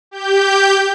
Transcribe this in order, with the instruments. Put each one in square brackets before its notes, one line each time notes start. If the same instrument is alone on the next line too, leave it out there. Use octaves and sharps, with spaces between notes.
[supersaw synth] G4 G6